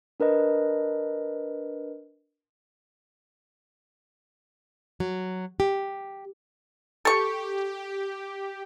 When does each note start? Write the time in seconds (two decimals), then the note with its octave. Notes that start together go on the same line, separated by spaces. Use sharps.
0.20 D4 A#4 B4 D#5
5.00 F#3
5.60 G4
7.05 G4 A4 C#6